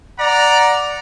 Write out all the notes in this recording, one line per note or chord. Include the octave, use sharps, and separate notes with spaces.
D5 F#5 A#5